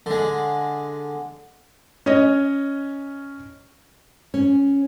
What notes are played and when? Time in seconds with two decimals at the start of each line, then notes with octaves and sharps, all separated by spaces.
0.06 D3 G#3
2.06 C#4 C#5 D#5
4.34 C#4